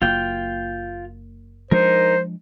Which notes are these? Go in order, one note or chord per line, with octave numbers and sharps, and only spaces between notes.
F#1 A#3 F4 G5
F3 G#3 D4 D#4 A#4 C5